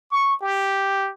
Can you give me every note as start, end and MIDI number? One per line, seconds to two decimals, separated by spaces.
0.11 0.36 85
0.42 1.11 67